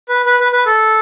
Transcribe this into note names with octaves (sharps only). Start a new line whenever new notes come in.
B4
B4
B4
B4
A4